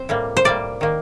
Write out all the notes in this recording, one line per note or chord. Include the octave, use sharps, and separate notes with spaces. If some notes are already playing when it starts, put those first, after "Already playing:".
Already playing: C4 C5
A2 G3 A#3
C5
A2 G3 A#3 D5
D#3 A#3